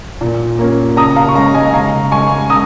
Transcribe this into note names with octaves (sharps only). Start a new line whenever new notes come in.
A#2
A#3 C#4
C#3 A#5 D#6
F5 A#5
C#6
G#3 C#4 F5 A#5
D#5 G#5
C#3 F5 A#5
G#3 C#4 G#5 C#6
C#3 A#5 D#6